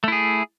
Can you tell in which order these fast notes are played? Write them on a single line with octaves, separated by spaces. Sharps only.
A3 E4 G#4